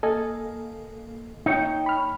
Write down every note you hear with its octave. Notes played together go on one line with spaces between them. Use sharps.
A#3 A4 D#5 G#5
D#4 C#5 G5
B5 F6